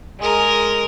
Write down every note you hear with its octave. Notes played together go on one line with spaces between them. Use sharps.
G#3 A#4